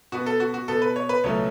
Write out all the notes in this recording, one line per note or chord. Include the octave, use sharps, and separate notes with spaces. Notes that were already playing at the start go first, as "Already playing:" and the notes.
B2 B3 F#4
A4
F#4
F#4
B2 B3 A4
B4
C#5
B4
C#2 B2 F#3 A3 C#4 C#5